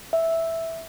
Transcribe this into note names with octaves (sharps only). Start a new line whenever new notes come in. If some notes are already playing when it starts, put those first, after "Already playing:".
E5